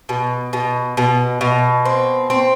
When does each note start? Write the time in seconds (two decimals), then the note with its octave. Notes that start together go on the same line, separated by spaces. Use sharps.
0.09 B2
0.53 B2
0.97 B2
1.41 B2
1.85 C4
2.30 C4